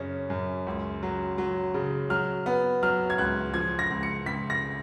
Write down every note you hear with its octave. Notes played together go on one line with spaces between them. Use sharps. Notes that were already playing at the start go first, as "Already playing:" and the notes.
Already playing: F#2 C#3 C#4
F#2
C#2
F#3
F#3
C#3
F#3 F6
B3
F#3 F6
G#6
C#2 F#6
F3 G#6
A#6
C#2
C#7
C#2 B6
A#6